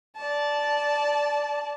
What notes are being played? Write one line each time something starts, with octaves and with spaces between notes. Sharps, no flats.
D5 A5